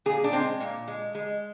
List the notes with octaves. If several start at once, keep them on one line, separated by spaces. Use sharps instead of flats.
A#2 G#4
D4
G#3 C4
A#2
G#3
G#3